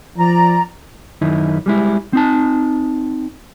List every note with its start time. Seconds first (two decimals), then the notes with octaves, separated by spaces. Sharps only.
0.17 F3 D5 A#5
1.21 F#2 D#3 D#4 E4
1.66 G3 G#3 E4
2.13 C4 D#4 A5